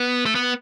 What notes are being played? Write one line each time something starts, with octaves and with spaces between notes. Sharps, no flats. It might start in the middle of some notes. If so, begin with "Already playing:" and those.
Already playing: B3
A3
B3